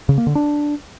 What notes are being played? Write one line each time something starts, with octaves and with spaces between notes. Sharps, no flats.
C#3
A#3
D3
D4